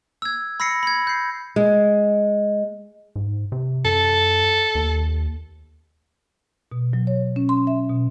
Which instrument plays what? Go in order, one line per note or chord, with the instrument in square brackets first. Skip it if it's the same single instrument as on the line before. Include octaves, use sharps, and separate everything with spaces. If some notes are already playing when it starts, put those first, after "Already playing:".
[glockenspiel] E6 G#6
B5 E6 A#6 C7 C#7
B5 G#6
G6 C7
[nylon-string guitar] G#3
[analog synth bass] G#2
C3
[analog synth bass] F#2 [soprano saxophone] A4
[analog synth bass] D#2
[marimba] B2
F#3
C#5
C#4
C6
E5
B2